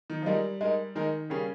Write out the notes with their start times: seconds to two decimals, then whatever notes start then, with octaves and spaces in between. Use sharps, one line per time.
0.10 D#3
0.22 F3
0.26 G3 G#3 D#4 A#4
0.61 G#3 D#4 A#4
0.95 D#3 G#3 D#4 A#4
1.30 C#3 G3 A#3 C#4 G#4